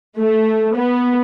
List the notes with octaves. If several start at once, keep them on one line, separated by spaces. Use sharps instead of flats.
A3
B3